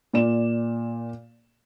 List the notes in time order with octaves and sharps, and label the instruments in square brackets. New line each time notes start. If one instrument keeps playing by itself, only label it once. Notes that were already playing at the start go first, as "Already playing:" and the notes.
[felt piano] A#2 D5 E7